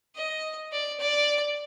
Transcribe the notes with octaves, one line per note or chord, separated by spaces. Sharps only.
D#5
D5
D5